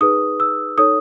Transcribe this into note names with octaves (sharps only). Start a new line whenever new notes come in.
D#4 G#4 B4 D#6
E6
D#4 A4 C#5 D#6